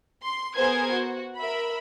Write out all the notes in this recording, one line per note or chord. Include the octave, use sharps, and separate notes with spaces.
C6
B3 G#4 A#4 C5 G#6
F#4
A#4 E5 B5